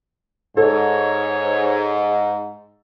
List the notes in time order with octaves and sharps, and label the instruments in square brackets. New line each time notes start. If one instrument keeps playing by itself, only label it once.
[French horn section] G#2 [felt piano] A4 [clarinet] C#5